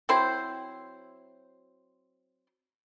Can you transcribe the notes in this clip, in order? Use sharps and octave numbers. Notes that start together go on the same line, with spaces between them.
F#3 C4 E4 C5